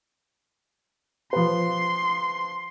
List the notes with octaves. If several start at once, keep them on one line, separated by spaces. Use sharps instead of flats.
F3 B4 C6